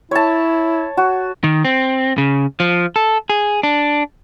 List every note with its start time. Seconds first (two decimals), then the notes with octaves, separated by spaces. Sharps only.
0.11 E4 C#5 A5
0.97 F#4
1.44 D#3
1.65 C4
2.18 C#3
2.60 F3
2.96 A4
3.30 G#4
3.63 D4